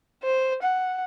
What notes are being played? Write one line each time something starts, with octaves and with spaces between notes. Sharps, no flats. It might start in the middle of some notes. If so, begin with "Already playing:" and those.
C5
F#5